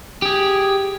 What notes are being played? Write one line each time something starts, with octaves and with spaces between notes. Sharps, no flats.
G4 G#4